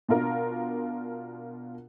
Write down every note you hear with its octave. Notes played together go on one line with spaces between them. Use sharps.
B2 D4 F4 A#4